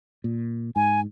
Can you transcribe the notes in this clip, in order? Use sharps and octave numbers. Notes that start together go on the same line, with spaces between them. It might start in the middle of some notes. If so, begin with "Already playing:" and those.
A#2
G#2 G#5